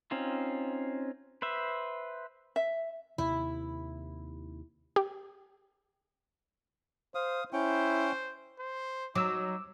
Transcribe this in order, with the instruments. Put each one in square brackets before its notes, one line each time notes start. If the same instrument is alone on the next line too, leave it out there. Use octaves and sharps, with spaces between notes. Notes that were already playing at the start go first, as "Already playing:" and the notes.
[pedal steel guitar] C4 C#4 D#4 F4
B4 C5 E5
[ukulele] E5
[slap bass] D#2 C3 [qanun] E4
[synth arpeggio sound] G4
[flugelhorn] C5 [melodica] F5 D#6
[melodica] C#4 G5 [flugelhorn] E4 [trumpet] C5
[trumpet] C5
[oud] F#3 [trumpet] D#4 [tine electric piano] D6 E6